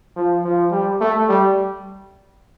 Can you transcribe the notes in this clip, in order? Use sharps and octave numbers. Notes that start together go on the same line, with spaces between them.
F3
F3
G3
A3
G3